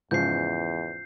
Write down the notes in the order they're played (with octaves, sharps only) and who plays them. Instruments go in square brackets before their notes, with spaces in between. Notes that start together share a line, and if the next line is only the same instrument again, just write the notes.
[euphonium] E2 [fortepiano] G#2 C#3 F3 [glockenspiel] G6 C7